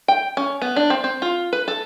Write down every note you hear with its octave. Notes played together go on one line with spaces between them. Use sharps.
G5
C#4
B3
D4
C4
C4
F4
B4
A4